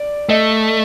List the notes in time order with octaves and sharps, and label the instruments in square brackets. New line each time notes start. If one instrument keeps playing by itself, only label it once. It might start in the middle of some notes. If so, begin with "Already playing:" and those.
Already playing: [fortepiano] D5
[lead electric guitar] A3 [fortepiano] D#5